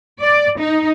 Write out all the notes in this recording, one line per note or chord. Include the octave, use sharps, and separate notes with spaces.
D5
D#4